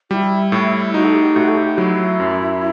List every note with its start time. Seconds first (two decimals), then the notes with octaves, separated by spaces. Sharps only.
0.10 G3 E4 F#4
0.52 A2
0.94 D#4 F#4
1.04 A4
1.14 G4
1.36 A2 F#4
1.49 A4
1.57 G4
1.78 F#3 E4
2.20 F#2